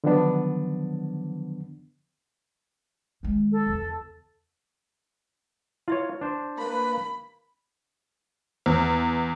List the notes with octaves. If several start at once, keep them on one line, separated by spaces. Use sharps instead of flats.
D3 D#3 F3 F#3 B3 D4
D#3 G#3
A4
E2 C#3
E4 F4 C#5 D5 E5
D4 C5
A#3 B4 B5
E2